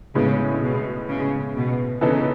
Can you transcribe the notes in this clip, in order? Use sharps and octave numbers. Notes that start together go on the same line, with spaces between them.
A2 C#3 G#3 B3
B2
C#3
B2
C#3 E3 B3 D#4 A4